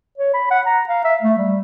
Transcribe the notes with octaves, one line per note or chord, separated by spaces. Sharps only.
C#5
B5
F#5
A#5
F5
E5
A3
G3